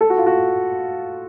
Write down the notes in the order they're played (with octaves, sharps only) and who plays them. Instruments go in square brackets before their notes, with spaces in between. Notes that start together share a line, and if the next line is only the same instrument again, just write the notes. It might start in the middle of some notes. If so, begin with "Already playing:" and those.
[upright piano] A4
F#4
F4
F#4